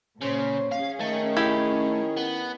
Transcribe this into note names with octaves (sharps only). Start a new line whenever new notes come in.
A#2 C#3 C#4 C5
C#4 G#4 F5
D#3 A3
E4 G4 F5
B3